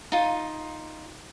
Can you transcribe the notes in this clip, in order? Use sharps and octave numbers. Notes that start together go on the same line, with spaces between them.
D#4 F4